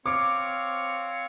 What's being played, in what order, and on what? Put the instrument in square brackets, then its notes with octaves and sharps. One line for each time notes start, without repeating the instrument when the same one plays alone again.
[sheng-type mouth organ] C4 C#5 F5 [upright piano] D6